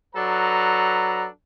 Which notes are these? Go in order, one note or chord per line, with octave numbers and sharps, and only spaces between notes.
F#3 D4 A4 B4 A#5